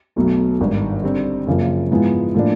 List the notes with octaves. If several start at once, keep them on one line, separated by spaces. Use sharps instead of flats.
B1 B2 F#3 A3
G#1 G2 D#3
D3 G3 C4
F#2 C#3 F3 A#3
G#2 F3 G#3 B3 E4
A2 F3 A#3 D4